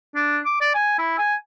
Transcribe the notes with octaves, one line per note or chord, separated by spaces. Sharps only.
D4
D6
D5
G#5
E4
G#5